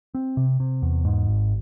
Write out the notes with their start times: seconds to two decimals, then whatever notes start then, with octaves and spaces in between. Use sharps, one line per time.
0.15 C4
0.37 C3
0.60 C3
0.82 E2
1.05 G#2
1.28 G#1